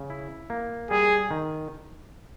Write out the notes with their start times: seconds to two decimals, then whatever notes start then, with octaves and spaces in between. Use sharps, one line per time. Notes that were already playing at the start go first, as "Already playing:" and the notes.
Already playing: C#3
0.10 E4
0.50 A#3
0.91 G3 G#4
1.31 D#3